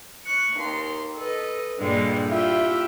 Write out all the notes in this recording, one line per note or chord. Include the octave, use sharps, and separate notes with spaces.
C#6 F#6
D#2 C6
A4 B4 D#5
G2 A#2 D3 G3 G#3
E4 F4 G4 E5 G5